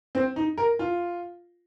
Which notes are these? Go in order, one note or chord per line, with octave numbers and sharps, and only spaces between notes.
C4
D#4
A#4
F4